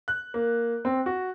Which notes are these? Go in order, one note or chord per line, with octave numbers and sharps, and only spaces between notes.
F#6
A#3
C4
F#4